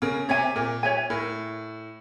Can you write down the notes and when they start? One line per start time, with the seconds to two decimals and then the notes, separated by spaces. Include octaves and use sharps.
0.02 C#3 A#4
0.29 C3 C#5 E5 G#5
0.56 A#2 A#4
0.83 C#5 E5 G#5
1.10 A2 A#4